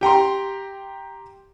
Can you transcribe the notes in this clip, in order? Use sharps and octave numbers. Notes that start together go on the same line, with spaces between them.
G4 G5 A#5 C6